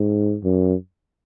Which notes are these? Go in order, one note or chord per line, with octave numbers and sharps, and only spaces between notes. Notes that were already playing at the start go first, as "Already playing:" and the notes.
Already playing: G#2
F#2